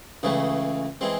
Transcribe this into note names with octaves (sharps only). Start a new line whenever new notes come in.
C#2 C#3 E3 A3
E3 G#3 C4